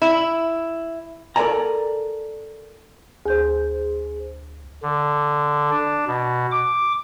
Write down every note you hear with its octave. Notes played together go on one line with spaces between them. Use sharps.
E4
A4 A#4 C#5 D5 G#5 A#5
D2 G#4 C5 G6
D3
D4
B2
D6